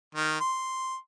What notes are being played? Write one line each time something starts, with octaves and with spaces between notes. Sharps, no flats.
D#3
C6